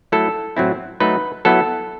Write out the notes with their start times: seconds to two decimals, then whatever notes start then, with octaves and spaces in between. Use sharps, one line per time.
0.12 F#3 A3 E4 A4
0.57 A2 F#3 C4 E4
1.00 F#3 A3 D#4 B4
1.45 F#3 B3 E4 A4